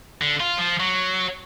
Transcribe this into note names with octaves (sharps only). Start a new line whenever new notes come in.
D3
F4
F3
F#3